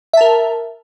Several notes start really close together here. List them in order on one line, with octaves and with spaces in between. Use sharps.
E5 A5 A#4